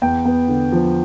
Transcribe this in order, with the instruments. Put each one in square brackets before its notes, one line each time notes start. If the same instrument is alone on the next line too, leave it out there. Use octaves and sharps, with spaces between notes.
[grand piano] E2 G5
B3
D3
F3